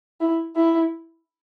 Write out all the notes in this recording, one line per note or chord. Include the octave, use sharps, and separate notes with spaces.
E4
E4